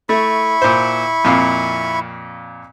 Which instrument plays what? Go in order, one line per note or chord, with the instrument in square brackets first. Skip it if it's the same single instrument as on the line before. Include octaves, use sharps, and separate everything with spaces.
[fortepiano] A3 [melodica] E4 B5 C#6
[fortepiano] A#2 C5
F2 A#2 F5